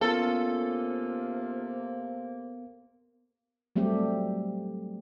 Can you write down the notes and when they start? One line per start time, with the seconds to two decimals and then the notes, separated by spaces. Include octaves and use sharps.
0.01 C3 A#3 B3 C#4 F4 A4 A#4 F5
3.76 F#3 G3 A3 C4 G4